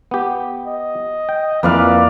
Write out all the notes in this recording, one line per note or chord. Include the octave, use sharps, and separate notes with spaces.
B3 G4
D#5
G5
F2 E3 A#3 B4 D5 F5